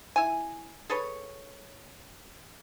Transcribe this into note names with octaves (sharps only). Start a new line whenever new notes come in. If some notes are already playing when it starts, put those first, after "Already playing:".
E4 G#5
G#4 A4 B4 C#5